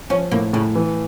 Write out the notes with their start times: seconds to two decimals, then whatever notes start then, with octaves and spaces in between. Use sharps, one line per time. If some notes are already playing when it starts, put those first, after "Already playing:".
0.10 F3 C#4
0.31 A2 A#3
0.53 A2 C#3
0.75 E3